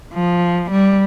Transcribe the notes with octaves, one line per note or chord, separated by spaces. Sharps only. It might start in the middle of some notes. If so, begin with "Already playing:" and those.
F3
G3